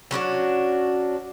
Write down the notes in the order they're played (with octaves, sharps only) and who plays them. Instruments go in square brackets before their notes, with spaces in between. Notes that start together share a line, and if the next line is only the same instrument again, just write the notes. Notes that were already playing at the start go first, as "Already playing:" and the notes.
[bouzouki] F#3 C#4 D4 F#4